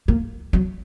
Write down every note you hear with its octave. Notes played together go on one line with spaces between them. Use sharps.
A#3
F#3